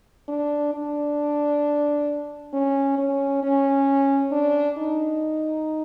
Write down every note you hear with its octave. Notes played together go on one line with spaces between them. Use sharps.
D4
D4
C#4
C#4
C#4
D4
D#4